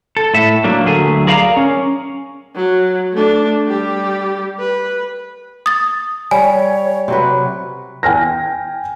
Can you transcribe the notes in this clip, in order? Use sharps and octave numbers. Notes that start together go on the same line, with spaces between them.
A4
A2 E5
F#3 A#3 D4
D2 F#3 A3 G#4
G#4 A#4 D5 F5 G5 A#5
C#4
F#3
A3 D4
G3 G4
B4
D#6 A6
G3 C#5 G#5
C3 F#3 B4
G5 G#5 F6 A#6